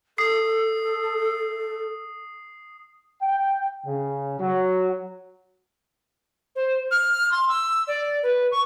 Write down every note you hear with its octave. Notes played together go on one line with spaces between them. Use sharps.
A4 D#6 C7
G5
C#3
F#3
C5
F6
C6
E6
D5
B4
C#6